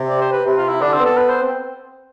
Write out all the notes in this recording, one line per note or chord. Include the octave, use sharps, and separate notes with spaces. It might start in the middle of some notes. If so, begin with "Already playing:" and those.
Already playing: C3
D5
C5
B4
C3
F4
E4
D3 D4
C4
B3
A4
B4
C5
C4